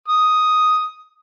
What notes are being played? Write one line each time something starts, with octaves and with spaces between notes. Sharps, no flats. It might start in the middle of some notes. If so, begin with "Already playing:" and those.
D#6